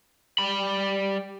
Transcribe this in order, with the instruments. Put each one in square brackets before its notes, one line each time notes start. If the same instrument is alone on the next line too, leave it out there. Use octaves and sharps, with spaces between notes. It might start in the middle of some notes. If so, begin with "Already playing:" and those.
[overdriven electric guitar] G3 B5